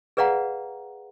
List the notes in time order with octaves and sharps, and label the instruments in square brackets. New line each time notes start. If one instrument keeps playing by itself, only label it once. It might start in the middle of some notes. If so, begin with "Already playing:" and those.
[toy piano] G#4 B4 D5 F5 F#5 A#5